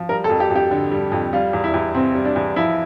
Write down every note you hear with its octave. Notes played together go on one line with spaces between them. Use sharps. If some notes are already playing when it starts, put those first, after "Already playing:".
Already playing: F3
G3 A#4
A4
F2
G4
F2
G4
D3
G3
F2
G3 F4
E2
E4
E2
C3 C4
G3
D4
E2
F3 E4